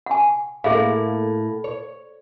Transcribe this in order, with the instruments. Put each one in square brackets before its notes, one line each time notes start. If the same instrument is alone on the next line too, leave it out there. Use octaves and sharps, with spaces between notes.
[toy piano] F#5 G#5
[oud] A2 A#3 [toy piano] G#4 E5 F5
[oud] C#5